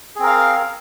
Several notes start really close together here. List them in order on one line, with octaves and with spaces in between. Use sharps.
G#4 C4 A#4 F5